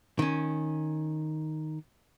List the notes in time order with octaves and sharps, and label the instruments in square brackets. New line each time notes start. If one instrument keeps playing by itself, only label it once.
[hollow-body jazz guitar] D#3 C#4